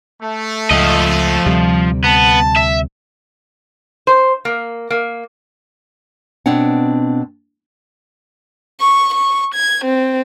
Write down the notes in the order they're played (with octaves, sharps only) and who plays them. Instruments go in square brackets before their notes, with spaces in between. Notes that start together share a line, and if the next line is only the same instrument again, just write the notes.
[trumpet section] A3
[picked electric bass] C#2 [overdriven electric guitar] F3 D#5
[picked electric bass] D2 C3 G3
[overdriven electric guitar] B3 [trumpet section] A5
[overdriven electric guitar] E5
[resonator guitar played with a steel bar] C5
A#3
A#3
[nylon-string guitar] B2 C4 D4 C#5 F#5
[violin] C#6
C#6
G#6
C4